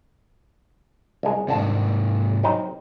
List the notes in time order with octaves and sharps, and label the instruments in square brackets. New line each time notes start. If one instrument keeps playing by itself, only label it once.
[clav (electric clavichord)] C2 G#3
[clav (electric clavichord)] G1 D4 A5 [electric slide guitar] G#2 C3
[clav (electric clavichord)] F#3 C4 D#4